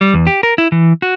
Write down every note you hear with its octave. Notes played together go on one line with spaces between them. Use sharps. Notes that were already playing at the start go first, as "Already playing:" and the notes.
G3
E2
G4
A#4
E4
E3
F#4